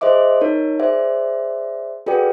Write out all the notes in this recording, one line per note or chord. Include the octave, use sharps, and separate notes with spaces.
G#4 C5 D#5 E5 D6
D#4 A#4 C#5
G#4 C5 D5 E5
F#4 G#4 A4 B4 D5 G5